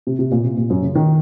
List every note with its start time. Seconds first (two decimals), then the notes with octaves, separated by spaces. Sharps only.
0.07 C3
0.19 C3
0.32 A#2
0.44 C3
0.57 A#2
0.70 F#2
0.83 C#3
0.95 D#3